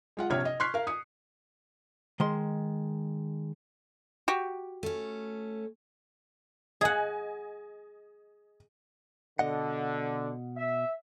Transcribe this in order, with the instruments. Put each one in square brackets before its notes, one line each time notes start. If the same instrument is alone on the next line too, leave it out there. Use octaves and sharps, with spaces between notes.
[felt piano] G#3 F4 F#5
A#1 C3 C#5 F6 G#6
D#5
C6 C#6 F6 F#6 B6 C7
A#4 F5
D#6 C#7
[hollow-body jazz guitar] D#3 G#3 C6
[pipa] F#4 G4
[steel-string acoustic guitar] A3 C#4
[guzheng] G#4 F#5 [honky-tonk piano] D#5 G#5
[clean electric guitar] B2 D#5 F#5 [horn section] D3
[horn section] E5